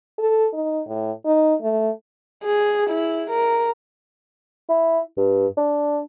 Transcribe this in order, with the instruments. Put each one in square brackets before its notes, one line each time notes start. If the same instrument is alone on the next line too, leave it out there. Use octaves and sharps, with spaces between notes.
[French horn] A4
D#4
A2
D#4
A3
[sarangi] G#4
E4
A#4
[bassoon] E4
G2
D4